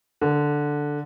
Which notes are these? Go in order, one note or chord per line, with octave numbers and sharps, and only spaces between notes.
D3